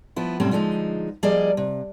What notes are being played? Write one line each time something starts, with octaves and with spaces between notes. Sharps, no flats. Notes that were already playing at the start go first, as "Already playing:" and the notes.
F3 B3 E4
F#2 A2 C3 G3 C4 C#4
D3 F3 G#3 C#4 D#4
F3 G3 A#3 G#4 D5 D#5
C3